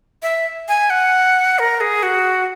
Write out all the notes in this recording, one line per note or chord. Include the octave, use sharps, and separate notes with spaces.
E5
G#5
F#5
A#4
G#4
F#4